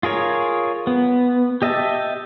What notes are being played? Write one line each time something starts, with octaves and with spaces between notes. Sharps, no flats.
F4 G#4 A#4 C#5
B3
G4 D#5 E5 A5